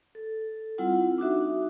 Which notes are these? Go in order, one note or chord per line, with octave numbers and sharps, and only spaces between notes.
A4
G3 C4 E4 F4 F#5
D4 D#4 F#4 E5